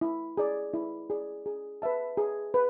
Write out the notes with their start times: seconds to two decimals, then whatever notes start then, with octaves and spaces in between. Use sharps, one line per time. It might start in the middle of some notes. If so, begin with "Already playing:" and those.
0.01 E4
0.37 G#4 D5
0.74 E4
1.10 G#4 D5
1.46 G#4
1.82 B4 E5 A5
2.17 G#4
2.54 B4